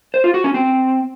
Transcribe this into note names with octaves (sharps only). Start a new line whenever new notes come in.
C5
F4
F#4
C#4
C4